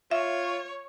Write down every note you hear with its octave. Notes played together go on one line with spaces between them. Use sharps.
F4 C#5 E5